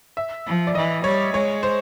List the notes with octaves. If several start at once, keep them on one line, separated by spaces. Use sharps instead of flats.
E5
F3
D5
E3 D#5
G3 C#5
G#3 C#5
C5